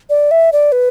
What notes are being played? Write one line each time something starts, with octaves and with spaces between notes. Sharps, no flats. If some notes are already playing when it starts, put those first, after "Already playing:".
D5
E5
D5
B4